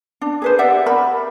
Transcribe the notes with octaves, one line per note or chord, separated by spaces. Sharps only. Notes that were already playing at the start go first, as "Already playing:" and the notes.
D4
G#4 B4 C5
G4 D5 E5 F#5
A#4 B5